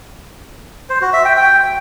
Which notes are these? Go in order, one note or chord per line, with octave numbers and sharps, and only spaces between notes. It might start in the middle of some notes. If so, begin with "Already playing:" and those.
C5
F#4
E5
G5
G5